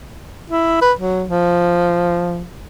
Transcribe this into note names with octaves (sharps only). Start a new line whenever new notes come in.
E4
B4
F#3
F3